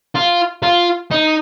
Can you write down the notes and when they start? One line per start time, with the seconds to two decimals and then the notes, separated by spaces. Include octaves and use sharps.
0.16 F4
0.63 F4
1.11 D#4